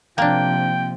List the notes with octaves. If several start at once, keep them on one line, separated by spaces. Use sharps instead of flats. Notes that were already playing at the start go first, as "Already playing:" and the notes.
C3 F3 A#3 D4 G5